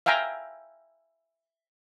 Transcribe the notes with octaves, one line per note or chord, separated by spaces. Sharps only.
E5 F5 G5 G#5 A#5